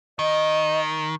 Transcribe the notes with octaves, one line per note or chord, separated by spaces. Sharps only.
D#3 D#5